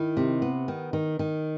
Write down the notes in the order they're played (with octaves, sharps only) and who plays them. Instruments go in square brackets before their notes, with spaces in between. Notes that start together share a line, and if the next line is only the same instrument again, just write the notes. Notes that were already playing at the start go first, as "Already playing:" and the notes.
Already playing: [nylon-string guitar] D#3 [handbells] E4
[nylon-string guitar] C3
B3
D#3
D#3
D#3